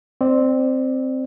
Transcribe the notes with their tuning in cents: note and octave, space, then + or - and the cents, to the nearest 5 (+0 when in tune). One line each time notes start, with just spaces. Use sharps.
C4 +0 D5 +20